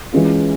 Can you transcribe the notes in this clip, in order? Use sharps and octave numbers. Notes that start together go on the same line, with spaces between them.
E3 G#3 C#4 F4